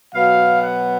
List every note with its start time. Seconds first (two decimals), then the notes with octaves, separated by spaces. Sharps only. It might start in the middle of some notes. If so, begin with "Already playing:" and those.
0.14 B2 F#3 B3 F5
0.62 F#5